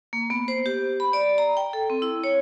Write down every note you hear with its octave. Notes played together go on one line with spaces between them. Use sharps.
A#3
B3
C5
G4
B5
D5
A#5
G5
A4
C4
E4
C#5